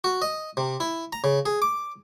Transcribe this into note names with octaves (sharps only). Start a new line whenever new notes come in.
F#4
D#5
C3
E4
A#5
C#3
G#4
D6